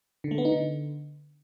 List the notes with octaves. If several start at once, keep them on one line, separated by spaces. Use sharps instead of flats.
D3
A3
B3
D#4
D3